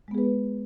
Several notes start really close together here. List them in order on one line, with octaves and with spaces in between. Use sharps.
G#3 B3 G#4 B4